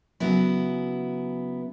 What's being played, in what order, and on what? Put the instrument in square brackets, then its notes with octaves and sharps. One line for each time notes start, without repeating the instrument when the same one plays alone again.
[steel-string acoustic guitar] C#3 F#3 B3 E4